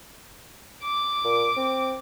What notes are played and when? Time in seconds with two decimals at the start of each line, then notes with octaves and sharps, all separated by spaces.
0.83 D6
1.24 A#2
1.57 C4